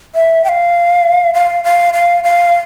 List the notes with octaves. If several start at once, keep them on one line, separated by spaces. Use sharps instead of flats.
E5
G5
F5
F5
F5
F5
F5